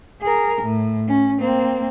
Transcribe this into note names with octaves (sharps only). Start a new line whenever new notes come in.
G#4 A#4
A2
C#4
A#3 C4